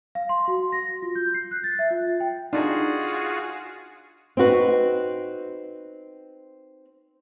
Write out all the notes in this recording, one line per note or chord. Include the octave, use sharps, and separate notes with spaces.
F5
C6
F#4
A#6
F4
G6
C7
F#6
A6
E5
F4
G5
D4 D#4 F4 F#4 G#4
C4 D#4 F#4 B4